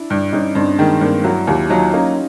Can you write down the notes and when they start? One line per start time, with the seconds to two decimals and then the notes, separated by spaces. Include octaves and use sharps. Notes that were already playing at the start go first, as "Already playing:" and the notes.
Already playing: D4 E4
0.10 G2
0.33 G2 C#4 D#4
0.55 G2 C4 D4
0.78 D#3 G#3 A#3
1.01 G2 A#3 C4
1.24 F#3 E4 F#4
1.47 D#2 F4 G4
1.70 F#3 D#4 F4
1.93 A#3 C#4 D#4